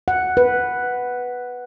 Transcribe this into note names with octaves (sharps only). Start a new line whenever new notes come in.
F#5
B4